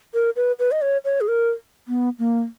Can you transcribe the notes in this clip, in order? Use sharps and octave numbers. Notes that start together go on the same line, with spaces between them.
A#4
B4
B4
D#5
C#5
C#5
G#4
A#4
B3
A#3